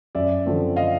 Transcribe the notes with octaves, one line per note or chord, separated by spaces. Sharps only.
F#2 D5 E5
D3 F3 A3 C4
D#5 F5